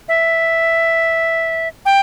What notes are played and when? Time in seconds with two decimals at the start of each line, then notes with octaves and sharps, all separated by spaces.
0.08 E5
1.85 G5